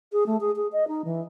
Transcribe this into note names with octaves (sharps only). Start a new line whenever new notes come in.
G#4
A3
G#4
G#4
D#5
D#4
E3